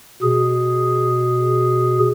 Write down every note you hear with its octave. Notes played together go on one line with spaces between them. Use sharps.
B2 G#4